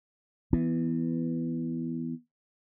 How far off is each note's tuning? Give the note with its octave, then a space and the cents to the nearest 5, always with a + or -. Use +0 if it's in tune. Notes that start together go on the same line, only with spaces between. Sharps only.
E3 +0 B3 +5